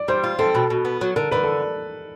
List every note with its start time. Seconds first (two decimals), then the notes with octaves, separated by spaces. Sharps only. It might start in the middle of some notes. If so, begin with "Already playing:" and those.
Already playing: D5
0.08 G3 C5
0.24 F4
0.39 C4 A4
0.55 B2
0.70 B2
0.85 B3
1.01 F#3
1.16 D3 A#4
1.31 D3 B4
1.43 A4